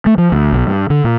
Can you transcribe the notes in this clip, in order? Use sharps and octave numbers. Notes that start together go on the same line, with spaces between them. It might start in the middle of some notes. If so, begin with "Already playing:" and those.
A3
F3
D2
B1
G2
D3
A#2